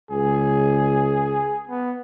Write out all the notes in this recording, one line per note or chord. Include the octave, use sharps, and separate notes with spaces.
C#2 G#4
B3